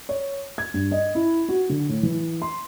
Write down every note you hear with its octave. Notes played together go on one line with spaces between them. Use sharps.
C#5
G#6
G2
D#5
E4
F#4
D3
A2
E3
C6